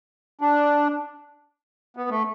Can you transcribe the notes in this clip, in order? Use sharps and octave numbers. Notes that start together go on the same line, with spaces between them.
D4
B3
A3